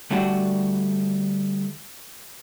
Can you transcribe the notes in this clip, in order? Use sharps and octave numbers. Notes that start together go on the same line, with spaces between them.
D3 G3 A3 D4 F#4 D5